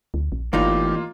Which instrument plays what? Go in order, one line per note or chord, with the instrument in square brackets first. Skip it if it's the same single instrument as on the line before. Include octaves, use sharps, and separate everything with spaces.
[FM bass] D2
A#1
[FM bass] G1 [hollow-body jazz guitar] E2 A2 D#4 [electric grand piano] A#3 F4 [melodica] G4